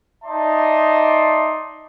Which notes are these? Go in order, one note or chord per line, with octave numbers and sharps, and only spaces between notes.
D#4 D5 E5 A5 C6